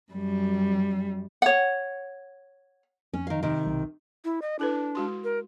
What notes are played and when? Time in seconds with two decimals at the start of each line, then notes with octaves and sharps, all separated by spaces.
0.12 F#2 G3
1.42 C#5 F#5
3.14 F2 C#4
3.27 D#3 F5
3.43 C3 D#3
3.66 B1
4.25 E4
4.42 D#5
4.59 D4 E4 A4 B4
4.95 G#3 F#4 C6
5.24 A#4